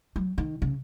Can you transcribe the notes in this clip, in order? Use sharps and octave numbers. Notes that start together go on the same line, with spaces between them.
F#3
D#3
C#3